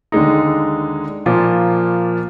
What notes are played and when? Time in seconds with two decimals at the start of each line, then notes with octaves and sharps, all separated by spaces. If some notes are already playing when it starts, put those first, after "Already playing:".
0.12 D#2 D3 G#3 D#4
1.26 A#2 F3 A#3 F4